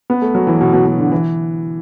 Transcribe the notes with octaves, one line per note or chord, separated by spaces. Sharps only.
B3
A3
F#3
E3
B2
B2
B2
D3
E3